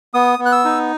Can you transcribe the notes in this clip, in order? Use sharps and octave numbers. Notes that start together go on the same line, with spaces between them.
B3 D#6
B3
F#6
E6
D#4